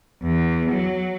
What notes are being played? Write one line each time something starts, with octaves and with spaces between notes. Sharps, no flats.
E2
F#3